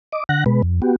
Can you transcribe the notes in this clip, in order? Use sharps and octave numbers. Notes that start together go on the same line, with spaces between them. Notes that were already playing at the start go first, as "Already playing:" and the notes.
D#5 D6
D3 F#5 F#6 A#6
B2 G#3 B4
F2
B3 F#4 G4